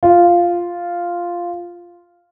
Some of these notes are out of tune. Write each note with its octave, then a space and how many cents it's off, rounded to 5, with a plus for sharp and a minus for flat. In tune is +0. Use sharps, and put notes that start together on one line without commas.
F4 -5